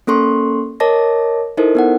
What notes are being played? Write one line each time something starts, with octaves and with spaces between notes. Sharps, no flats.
A#3 C#4 A4 C6 C#6
A#4 C#5 D#5 A5 D6 A#6
D#4 E4 A4 A#4 C5 D#5
B3 D#4 F#5